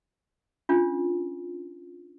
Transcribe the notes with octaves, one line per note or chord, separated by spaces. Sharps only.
C#4 D4 F4